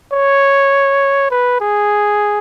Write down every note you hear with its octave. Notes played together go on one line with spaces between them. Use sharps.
C#5
B4
G#4